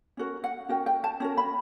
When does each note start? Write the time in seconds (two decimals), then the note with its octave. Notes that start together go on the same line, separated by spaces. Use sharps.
0.17 C#4 F#4 A#4
0.44 F#5
0.69 C#4 F#4 A#4 G5
0.86 G5
1.04 A5
1.20 C#4 F#4 A#4
1.37 B5